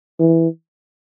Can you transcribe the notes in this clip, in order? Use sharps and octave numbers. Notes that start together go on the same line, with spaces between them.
E3